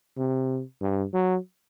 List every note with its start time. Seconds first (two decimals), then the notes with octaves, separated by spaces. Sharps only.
0.17 C3
0.82 G2
1.14 F#3